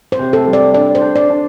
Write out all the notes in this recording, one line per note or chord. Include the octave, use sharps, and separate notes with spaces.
C5
C3
A4
G3
D5
D4 D5
C5
D4
D5
D4